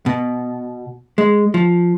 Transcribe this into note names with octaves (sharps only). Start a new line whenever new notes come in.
B2
G#3
F3